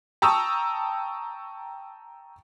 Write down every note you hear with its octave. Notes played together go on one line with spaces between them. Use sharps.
G5 A5 A#5 C#6 D#6 E6